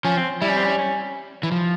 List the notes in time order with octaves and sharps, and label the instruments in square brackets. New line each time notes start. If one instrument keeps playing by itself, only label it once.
[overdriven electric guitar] F3 [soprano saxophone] C#4
[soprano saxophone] C4
[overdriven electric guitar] G3 [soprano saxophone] E4
[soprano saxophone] C#4
C4
C#4
C#4
[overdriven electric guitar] E3
F3